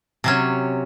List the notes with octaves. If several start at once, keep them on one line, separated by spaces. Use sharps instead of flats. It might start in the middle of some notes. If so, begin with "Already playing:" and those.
C3 F#3 C#4